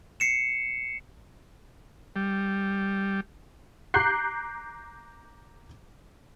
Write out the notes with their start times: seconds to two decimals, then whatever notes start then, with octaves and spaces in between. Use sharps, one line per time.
0.20 C7 C#7 E7
2.16 G3
3.94 A#5 D6 F#6 G6 C7